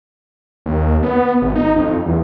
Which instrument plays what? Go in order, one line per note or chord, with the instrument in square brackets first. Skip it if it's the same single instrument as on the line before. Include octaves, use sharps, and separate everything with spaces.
[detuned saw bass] D#2
B3
G#1
D#4
F2
E2